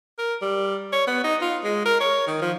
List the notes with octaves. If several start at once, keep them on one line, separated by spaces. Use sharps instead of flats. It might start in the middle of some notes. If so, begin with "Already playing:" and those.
A#4
G3
C#5
B3
D#4
F4
G#3
A#4
C#5
D#3
F3